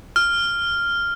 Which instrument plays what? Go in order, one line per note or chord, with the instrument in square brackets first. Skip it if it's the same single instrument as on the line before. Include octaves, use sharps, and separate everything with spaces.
[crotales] F6